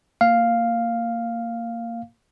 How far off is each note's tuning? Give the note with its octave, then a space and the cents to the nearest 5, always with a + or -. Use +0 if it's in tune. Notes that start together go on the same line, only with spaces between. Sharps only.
A#3 -15 F5 +0